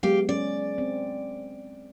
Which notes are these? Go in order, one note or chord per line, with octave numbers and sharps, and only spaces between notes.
F#3 G#3 B3 G4 F5
C#4 D5
C4